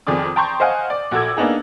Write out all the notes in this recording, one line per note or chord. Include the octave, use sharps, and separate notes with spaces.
F2 D#3 G#4 D5 D6 D#6
G5 A5 A#5 C6 C#6 G6
C5 D#5 F5 F#5 G#5
D5
A#1 F#4 A4 D6 E6 G#6
A#3 B3 D4 D#4 G#4